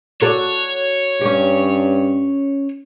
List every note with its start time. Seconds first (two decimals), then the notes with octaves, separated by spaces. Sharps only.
0.21 F#4 A4 C#5 D5
1.21 G2 C#4 G4